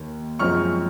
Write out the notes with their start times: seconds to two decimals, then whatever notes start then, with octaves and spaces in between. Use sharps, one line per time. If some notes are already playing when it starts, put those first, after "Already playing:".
Already playing: D#2 D#3 A#3
0.39 F#2 F3 G#3 C4 C#6 F6